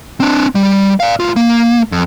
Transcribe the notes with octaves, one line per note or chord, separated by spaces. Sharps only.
C4 D4
G3
D5 F5
A2 F4
A#3
F2